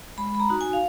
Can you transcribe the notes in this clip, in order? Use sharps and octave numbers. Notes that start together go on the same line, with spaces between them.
G#3 B5
B5
A#5
D#4 F#4
G#5
F5